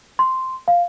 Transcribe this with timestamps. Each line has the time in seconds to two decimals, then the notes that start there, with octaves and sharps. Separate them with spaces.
0.19 C6
0.68 F5